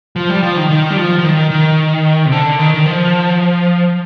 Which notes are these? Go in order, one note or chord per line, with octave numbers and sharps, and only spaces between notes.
F3
G3
F3
D#3
D#3
G3
F3
F3
D#3
D#3
C3
D3
D#3
D#3
F3